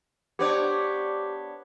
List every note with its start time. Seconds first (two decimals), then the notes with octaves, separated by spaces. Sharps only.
0.39 B3 D4 G4 C5 C#5 D6